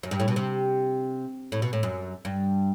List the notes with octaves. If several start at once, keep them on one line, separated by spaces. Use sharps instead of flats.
F#2
G2
A2
B2
C3
A2
B2
A2
F#2
G2